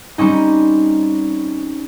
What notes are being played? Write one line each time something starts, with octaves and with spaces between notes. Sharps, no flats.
G3 C4 C#4 D#4